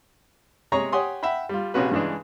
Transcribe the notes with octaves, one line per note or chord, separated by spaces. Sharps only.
C3 G#3 G#4 C#5 A#5 C#6
G4 C#5 F#5 G#5 C6 D#6
E5 F#5 G5 B5
G3 F4
A#1 C3 C#4 F#4 B4
G2 C#3 E3 G#3 D4